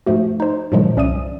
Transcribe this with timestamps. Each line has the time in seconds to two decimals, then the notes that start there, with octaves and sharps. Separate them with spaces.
0.06 G#2 F3 A3 F#4
0.40 D#4 C5
0.72 G2 A#2 D#3 F3 F#3 G#3
0.96 C2 C#4 D5 E5 D#6 D#7